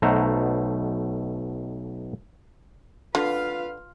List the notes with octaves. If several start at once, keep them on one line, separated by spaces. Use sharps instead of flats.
B1 B2 A3 C5 F#5 A#5
D3 F4 B4 F5